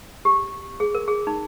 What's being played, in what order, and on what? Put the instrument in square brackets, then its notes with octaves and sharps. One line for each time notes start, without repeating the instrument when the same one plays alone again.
[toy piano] G4
G#4
A#4
G#4
D#4